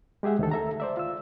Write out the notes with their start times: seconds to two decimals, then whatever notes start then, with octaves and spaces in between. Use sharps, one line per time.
0.23 G#3 G4 G#4 E5 F#5
0.39 D2 D#3 A4
0.52 A4 E5 A#5
0.80 C5 D5 E5
0.97 F4 E6